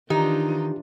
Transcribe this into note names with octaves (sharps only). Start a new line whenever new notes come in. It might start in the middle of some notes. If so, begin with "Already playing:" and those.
D#3 E3 D4 D#4 F4 G4